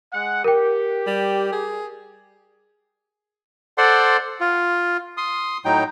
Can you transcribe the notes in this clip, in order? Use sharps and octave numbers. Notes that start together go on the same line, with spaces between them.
G#3 F#5
G4 A#4 G5
G3
G#4
A4 C5 D5 F#5 C6
F4
C6 D#6
A2 F#3 D#4 G5